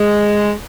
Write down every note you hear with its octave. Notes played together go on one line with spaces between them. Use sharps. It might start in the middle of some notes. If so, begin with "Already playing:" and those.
Already playing: G#3